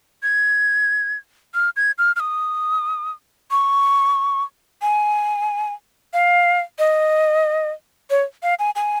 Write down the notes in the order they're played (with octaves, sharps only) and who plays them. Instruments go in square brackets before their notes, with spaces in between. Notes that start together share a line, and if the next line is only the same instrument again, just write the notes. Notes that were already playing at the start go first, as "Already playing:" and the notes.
[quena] G#6
F6
G#6
F6
F6
D#6
C#6
G#5
F5
D#5
C#5
F5
G#5
G#5